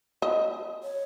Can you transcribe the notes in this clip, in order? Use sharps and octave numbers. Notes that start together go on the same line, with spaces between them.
D#5
C#5